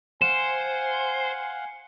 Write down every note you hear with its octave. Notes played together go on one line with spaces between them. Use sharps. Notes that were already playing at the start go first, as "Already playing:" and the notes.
C5 F5 F#5 G#5 E7